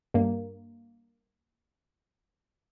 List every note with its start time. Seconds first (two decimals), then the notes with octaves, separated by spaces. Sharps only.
0.14 G2 A#3